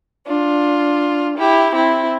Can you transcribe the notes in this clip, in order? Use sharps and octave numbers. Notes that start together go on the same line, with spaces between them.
D4 F4
E4 G4
C4 E4